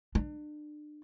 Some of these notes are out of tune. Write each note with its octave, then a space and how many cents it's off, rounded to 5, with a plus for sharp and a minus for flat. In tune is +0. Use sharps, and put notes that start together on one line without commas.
D4 +35